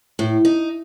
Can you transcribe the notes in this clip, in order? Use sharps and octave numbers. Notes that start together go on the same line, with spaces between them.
A2
D#4